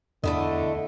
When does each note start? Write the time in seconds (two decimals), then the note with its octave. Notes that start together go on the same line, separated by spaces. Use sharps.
0.24 E2 D3 A3 E4 D#5